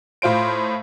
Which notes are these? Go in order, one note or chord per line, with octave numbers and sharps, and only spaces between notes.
A2 F4 C5 D7